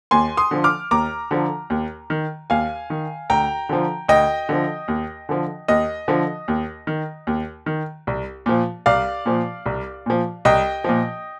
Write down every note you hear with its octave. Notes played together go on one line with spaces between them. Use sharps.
D#2 G#5 C6
C6 D#6
D3 F3
D6 F6
D#2 A#5 D6
D3 F3
D#2
D#3
D#2 F5 G#5
D#3
D2 G5 A#5
D3 F3
D2 D#5 G5
D3 F3
D#2
D3 F3
D#2 D#5
D3 F3
D#2
D#3
D#2
D#3
C2
A#2 F3
C2 D5 F5
A#2 F3
C2
A#2 F3
C2 D#5 G5
A#2 F3